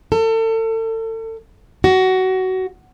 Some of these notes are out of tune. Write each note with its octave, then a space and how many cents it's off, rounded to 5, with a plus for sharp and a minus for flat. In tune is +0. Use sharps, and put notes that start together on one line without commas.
A4 +35
F#4 +20